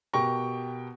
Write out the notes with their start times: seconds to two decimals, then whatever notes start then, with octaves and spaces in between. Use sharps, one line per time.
0.13 B2 G4 A#4 G5 C#6 A#6